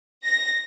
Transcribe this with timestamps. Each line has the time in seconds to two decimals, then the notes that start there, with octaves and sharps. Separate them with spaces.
0.24 A#6